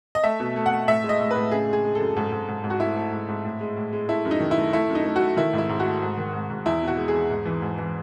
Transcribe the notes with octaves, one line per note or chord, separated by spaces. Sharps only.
D#5
A3 E5
B2
A3
F#5
A3
A2 E5
G#3
D#5
A2
A2 B4
C#3 G#4
G#3 G#4
G#3
F#2 A4
G#2 A4
G#2
G#2
G#2
F#4
A3 E4
A3
G#2
G#2
A2
G#3
A2
G#3
A3 E4
F#2
D#4
D#3
E4
A3
A3 E4
F#2
D#4
A3
F#4
A3
D#3 E4
G#2
E4
G#2
F#4
A3
G#2
D#3
G#2
G#2
E2 E4
B2
F#4
G#3
G#4
E2
G#2
E3
G#2
E3